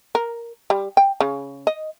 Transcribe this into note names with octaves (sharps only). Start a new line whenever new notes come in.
A#4
G3
G5
C#3
D#5